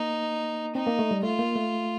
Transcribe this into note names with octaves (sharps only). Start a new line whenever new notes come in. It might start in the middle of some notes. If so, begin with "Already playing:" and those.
Already playing: A#3 D#4
C4 D#4
A#3
A3
G3
A3 F4
A#3
A3